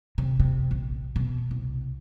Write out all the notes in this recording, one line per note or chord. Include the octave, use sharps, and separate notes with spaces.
C3
C3
A#1
B2
C2